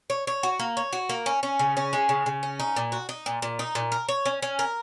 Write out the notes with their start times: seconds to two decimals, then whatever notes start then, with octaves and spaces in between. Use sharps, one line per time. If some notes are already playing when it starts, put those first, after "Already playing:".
0.10 C#5
0.27 C#5
0.43 F#4
0.60 A#3
0.77 C#5
0.93 F#4
1.09 A#3
1.26 C#4
1.43 C#4
1.59 C#3
1.77 C#4
1.93 G#3
2.09 C#3
2.26 C#3
2.43 C#4
2.60 D#4
2.76 A#2
2.92 F#4
3.09 D#4
3.26 A#2
3.42 A#2
3.59 D#4
3.75 A#2
3.92 A#4
4.09 C#5
4.25 C#4
4.42 C#4
4.59 A#4